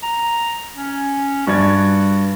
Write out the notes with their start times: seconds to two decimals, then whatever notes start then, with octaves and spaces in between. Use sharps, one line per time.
0.03 A#5
0.76 C#4
1.47 G2 F#4 D5 G#6